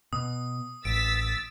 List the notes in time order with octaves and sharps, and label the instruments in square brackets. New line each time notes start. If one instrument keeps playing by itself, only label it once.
[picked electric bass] B2 [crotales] D#6
[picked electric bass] A1 [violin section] E6 A6 B6 [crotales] D7